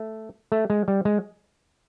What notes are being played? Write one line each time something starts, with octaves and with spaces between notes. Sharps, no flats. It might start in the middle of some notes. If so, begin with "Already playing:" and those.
Already playing: A3
A3
G#3
G3
G#3